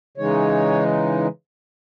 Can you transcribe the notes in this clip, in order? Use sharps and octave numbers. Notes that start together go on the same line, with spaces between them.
C#3 E3 G#3 D#4 C#5